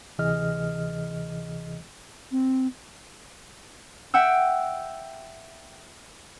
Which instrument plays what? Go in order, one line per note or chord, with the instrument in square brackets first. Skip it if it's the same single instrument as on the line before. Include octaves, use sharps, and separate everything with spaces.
[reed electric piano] D2 C3 E3 G#4 D#5 F6
[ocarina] C4
[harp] E5 F#5 G5 E6